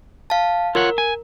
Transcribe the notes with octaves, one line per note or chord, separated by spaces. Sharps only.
F5 A5
F4 A#4 C#5 F#5
G#5